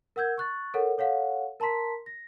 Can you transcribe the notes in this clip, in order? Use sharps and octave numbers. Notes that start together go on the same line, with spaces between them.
A#4 F#5 E6 G6 G#6
C#6 F#6 A6
A4 A#4 C#5 F#5
A4 C#5 F5 F#5
A#4 A5 A#5 C6 B6
A#6